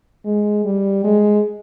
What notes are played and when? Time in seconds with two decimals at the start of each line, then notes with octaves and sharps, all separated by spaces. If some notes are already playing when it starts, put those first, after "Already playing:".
0.25 G#3
0.65 G3
1.04 G#3